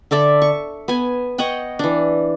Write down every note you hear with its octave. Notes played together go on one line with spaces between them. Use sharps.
D3 A4 D5 E5
C#6
B3 G#5
C#5 D#5 F#5 G5
E3 D4